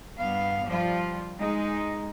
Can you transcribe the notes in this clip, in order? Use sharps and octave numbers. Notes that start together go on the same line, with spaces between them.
G2 B3 F5
F3 G3 F4
G#3 D#4